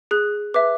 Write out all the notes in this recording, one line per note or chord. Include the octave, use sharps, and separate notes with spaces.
G#4 F#6
B4 E5 D6